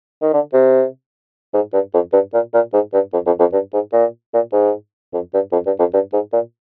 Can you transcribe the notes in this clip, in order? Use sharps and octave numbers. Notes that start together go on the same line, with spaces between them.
D#3
D3
C3
G#2
G2
F2
G2
A#2
A#2
G#2
G2
F2
F2
F2
G2
G#2
A#2
A#2
G#2
F2
G2
F2
G2
F2
G2
G#2
A#2